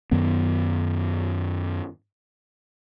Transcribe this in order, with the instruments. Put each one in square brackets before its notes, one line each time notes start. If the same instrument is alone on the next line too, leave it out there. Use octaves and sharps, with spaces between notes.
[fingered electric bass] F#2 D#3 B3